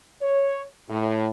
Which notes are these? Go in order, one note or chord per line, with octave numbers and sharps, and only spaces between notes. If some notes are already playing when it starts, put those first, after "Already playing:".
C#5
A2